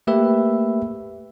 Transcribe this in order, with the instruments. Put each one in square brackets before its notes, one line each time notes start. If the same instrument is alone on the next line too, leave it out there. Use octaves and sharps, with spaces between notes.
[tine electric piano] A3 A#3 G4 B4 E5